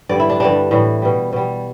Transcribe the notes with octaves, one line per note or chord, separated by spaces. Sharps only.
G2 D3 G3 D5
E4
D4
G2 D3 G3 D4
A2 E3 G3
B2 G3
B2 G3